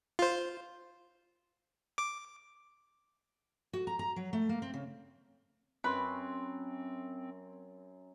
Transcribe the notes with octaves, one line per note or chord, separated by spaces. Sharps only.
F4 C5
D6
F#4
A#5
A#5
F#3
A3
A#3
C4
C#3
F#2 C4 B4 C6